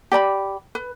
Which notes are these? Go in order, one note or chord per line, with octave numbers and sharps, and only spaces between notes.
G4 D5 A#5 B5
B4